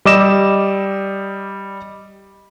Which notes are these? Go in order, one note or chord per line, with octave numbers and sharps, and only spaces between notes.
G3 D#5 D6 E6 E7